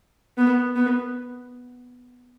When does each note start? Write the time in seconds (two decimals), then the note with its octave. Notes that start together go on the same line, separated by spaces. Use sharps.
0.37 B3
0.75 B3